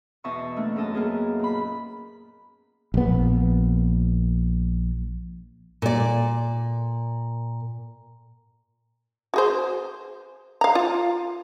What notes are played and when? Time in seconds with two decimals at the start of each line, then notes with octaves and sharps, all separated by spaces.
0.24 E2 B2 D#5 E5 A5 C#6
0.57 A3 A#3 D4
0.76 F#2 A4 D#5 A5
0.95 A#3 B3 G#4
1.39 A#2 B5
2.94 A#1 B3
5.82 A#2 D5
9.34 F#4 G#4 C5
10.61 F5 A#5
10.75 F4